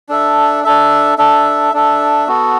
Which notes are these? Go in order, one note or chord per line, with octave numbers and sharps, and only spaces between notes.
D4 A4 E5
D4 A4 E5
D4 A4 E5
D4 A4 E5
B3 F#4 A4